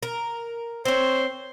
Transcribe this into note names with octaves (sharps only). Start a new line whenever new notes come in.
A#4
C4 C5 C#5